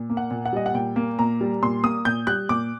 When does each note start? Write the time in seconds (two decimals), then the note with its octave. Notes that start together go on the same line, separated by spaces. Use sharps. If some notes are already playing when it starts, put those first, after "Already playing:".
Already playing: A#2
0.10 A#3
0.17 F#5
0.31 A#2
0.45 F#5
0.53 G3 D#5
0.66 F#5
0.74 A#2 G5
0.96 A#3
1.19 A#2 A#5
1.41 G3
1.62 A#2 C6
1.83 A#3 D#6
2.05 A#2 G6
2.27 G3 F#6
2.49 A#2 D6